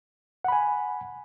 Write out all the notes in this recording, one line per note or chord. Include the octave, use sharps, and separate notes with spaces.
F#5 G#5 B5